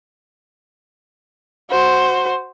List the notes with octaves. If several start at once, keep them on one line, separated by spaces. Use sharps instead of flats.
F#4 C5